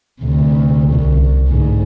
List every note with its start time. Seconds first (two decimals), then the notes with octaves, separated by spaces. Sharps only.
0.21 D2 C3
0.93 C2
1.48 D2 G#2